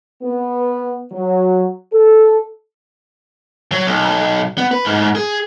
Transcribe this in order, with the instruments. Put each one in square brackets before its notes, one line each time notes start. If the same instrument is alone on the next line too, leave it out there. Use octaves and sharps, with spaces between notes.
[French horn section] B3
F#3
A4
[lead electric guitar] F#3
B1
B3
B4
G#2
G#4